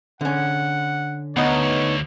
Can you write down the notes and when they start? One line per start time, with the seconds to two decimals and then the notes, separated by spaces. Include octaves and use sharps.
0.21 D3 C#4 F#5
1.37 D2 B3 D#4 C#5